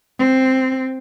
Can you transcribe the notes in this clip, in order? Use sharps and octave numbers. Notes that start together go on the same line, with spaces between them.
C4